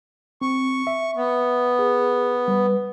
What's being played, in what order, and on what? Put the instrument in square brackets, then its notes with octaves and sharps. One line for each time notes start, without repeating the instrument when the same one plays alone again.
[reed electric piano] C4 [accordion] C#6
[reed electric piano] E5
[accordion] B3
[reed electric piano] G#4
G3 B4